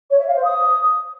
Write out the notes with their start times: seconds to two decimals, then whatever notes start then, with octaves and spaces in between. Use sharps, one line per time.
0.10 C#5
0.18 E5
0.27 F5
0.35 C5
0.44 D#6